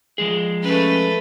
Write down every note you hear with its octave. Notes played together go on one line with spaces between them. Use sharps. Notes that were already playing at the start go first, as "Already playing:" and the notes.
F3 G#3 G#4
A3 C#4 B4